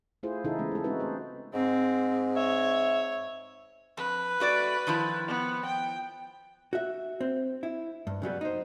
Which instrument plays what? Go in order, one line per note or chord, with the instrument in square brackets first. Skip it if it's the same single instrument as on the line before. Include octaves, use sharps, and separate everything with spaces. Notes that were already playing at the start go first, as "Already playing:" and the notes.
[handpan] A3 E4 F4 G#4 C5
C#3 E3 D#4 E4 G#4 A4
E3 G#3 A3 B3 C#4
G#3 A4
G#3 C4 C#4 D#4 F#4 B4
A3 C5
[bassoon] G#2 [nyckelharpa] C4
[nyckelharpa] C#5 [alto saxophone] E5
[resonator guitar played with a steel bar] F2 [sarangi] B4
[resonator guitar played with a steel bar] A3 F#4 D5
D#3 F3 E4
[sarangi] B3
G5
[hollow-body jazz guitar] F#4 E5
C4
E4
G2
C#3 F#3 G3 B3
D#4 C5